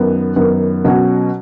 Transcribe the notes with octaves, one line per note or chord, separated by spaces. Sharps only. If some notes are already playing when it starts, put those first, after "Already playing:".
Already playing: F#2 D#3 B3
F#2 D#3 B3
B2 F#3 C#4 F#4